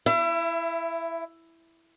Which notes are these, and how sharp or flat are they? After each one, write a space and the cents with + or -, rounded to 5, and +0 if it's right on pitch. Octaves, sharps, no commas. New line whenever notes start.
E4 +10 E5 +35